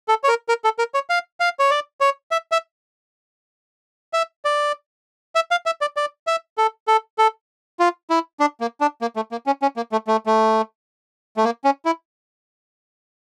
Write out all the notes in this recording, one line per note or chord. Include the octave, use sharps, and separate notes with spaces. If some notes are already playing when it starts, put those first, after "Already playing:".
A4
C#5
A#4
A#4
A4
A#4
C#5
F5
F5
C#5
D5
C#5
E5
E5
E5
D5
E5
F5
E5
D5
D5
E5
A4
A4
A4
F4
E4
D4
A#3
D4
A#3
A3
A#3
C#4
C#4
A#3
A3
A3
A3
A3
A#3
C#4
E4